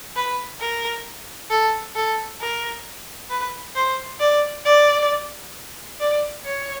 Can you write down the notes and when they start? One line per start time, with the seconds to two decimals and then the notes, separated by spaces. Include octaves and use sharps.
0.16 B4
0.61 A#4
1.50 A4
1.96 A4
2.41 A#4
3.30 B4
3.76 C5
4.21 D5
4.65 D5
6.00 D5
6.45 C#5